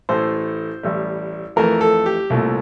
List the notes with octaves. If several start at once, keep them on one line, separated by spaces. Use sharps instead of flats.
A1 A2 E3 A3 C5
A1 A2 G3
F2 E3 A3 A#4
A4
G4
C2 A#2 A3